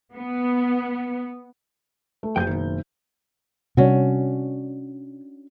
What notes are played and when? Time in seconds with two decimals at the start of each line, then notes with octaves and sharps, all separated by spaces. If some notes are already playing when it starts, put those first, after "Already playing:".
0.14 B3
2.23 A3
2.36 F#1 G#4 G5 G6
2.47 B2 D#3
3.77 C3 G3 C#4 D4 F#4